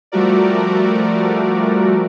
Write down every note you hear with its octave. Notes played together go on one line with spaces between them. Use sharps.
F3 G3 A3 F#4 A#4 D5